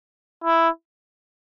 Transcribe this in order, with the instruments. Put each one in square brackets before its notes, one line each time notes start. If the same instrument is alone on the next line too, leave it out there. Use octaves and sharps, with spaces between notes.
[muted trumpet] E4